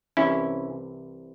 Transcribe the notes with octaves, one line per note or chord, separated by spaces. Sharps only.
C2 C3 E3 C#4 E4